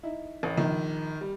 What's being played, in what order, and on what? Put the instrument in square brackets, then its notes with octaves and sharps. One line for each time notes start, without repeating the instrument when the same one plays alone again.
[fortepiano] D#4 E4
[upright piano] A1
[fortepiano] A#1 [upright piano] D#3
[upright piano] G3